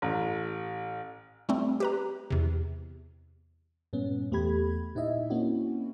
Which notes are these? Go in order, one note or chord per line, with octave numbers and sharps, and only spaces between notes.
A1
G3 A3 C4
G4 B4 A#5
E2 C3
G2 A#2 B3 C#4
E2 A3 B3 G4 B5 G#6
A#2 D#4 E4 D#5 E5
A#3 C4 C#4 E4 F#4